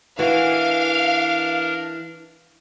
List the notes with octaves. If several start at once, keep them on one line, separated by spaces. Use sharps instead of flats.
E3 D4 F#4 A#4 F5